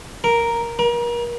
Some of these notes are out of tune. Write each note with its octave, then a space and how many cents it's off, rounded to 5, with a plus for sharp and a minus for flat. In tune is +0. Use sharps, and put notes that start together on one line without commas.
A#4 +0
A#4 +35